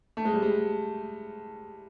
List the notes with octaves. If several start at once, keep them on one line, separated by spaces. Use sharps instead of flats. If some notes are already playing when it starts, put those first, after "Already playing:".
A3
G#3
G3
G#3